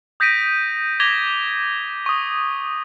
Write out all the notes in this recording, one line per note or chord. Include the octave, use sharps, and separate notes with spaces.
D#6 G6 A#6 B6 D7 D#7
D6 G#6 A#6 B6 F7 G7
C#6 D#6